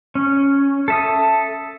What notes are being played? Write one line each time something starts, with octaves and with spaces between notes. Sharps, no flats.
C#4
A4 E5 D#6